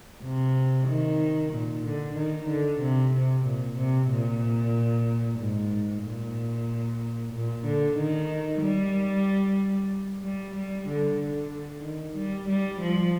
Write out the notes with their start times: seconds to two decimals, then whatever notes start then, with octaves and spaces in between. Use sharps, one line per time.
0.23 C3
0.88 D#3
1.53 A#2
1.85 D3
2.16 D#3
2.49 D3
2.81 C3
3.14 C3
3.46 A#2
3.78 C3
4.11 A#2
5.39 G#2
6.04 A#2
7.33 A#2
7.65 D3
7.97 D#3
8.62 G3
10.24 G3
10.55 G3
10.88 D3
11.20 D3
11.84 D#3
12.17 G3
12.49 G3
12.81 F3